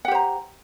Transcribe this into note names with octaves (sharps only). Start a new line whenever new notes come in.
G4 C5 F#5 A#5